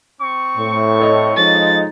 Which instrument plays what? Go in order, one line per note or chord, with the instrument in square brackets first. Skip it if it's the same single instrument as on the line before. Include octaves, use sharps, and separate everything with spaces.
[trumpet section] C4 C#6
[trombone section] A2
[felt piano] A4 C#5 D#5
[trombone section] F3 G#3 D#4 [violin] A6